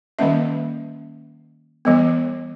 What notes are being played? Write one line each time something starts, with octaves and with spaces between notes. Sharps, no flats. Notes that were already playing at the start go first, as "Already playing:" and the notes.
D#3 G3 A#3 C#4 E5
E3 G3 B3